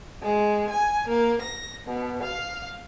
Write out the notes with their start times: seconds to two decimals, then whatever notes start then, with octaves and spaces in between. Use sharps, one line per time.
0.23 G#3
0.70 G#5
1.07 A#3
1.42 A#6
1.87 B2
2.23 F5